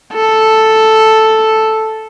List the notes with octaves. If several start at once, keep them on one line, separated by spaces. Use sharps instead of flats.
A4